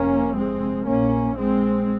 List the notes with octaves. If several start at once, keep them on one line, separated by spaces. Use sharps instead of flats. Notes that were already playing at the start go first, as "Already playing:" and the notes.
Already playing: F1 F2 C3 A#3 C#4
G#3 C4
A#1 A#2 A#3 C#4
G#3 C4